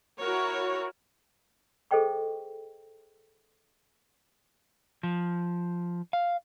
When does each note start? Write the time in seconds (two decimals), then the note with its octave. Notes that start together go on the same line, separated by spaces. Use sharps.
0.20 E4 F#4 A#4 C#5
1.91 G#4 A4 C5 D#5 G5 C#6
5.03 F3
6.13 F5